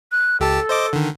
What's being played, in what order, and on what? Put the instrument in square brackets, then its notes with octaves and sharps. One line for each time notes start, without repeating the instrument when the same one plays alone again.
[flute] F#6
[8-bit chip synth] C#2 G4 A5 [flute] A4
[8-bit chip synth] C5 D#5 D6
D3 D#3